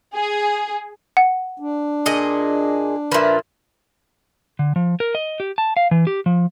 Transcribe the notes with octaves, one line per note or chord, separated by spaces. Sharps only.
G#4
F#5
D4
A#2 G#4 D#5
A#2 F3 B4 E5
D3
F3
A#4
D#5
G4
A5
F5
E3
G4
F3